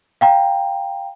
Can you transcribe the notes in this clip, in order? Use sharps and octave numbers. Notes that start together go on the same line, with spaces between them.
F5 G5 A#5